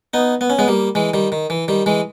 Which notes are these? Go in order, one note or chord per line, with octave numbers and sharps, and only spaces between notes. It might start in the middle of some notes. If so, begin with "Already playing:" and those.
B3 D#4
B3
C#4
G#3 B3
G3 A#3
E3 G#3
D#3 G3
D#3
E3
D#3 G3
E3 G#3